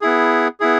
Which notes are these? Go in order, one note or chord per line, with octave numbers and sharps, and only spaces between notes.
B3 E4 G#4
B3 E4 G#4